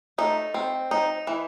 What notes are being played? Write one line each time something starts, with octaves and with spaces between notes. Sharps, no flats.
A3 D#4
C4
D#4
E3